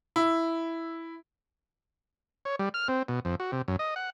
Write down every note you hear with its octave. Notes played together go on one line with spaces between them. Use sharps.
E4
C#5
G3
F6
C4
B2
F2
F#4
C3
F#2
D#5
F#5